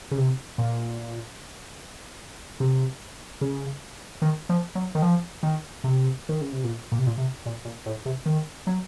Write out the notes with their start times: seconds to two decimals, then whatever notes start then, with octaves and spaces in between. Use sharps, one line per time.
0.11 C#3
0.18 C3
0.58 A#2
2.60 C3
3.41 C#3
4.22 D#3
4.49 F3
4.75 F#3
4.95 D#3
5.02 F3
5.43 D#3
5.84 C3
6.29 D#3
6.41 C#3
6.52 C3
6.64 A#2
6.92 A#2
6.98 C3
7.07 A#2
7.18 C3
7.46 A#2
7.65 A#2
7.86 A2
8.05 C3
8.26 D#3
8.67 F#3